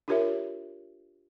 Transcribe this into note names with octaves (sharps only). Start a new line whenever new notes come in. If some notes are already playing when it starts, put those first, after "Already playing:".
D4 F4 G4 A#4 C#5 E5